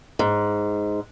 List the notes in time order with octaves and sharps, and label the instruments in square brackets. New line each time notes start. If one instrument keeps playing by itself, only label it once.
[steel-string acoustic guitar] G#2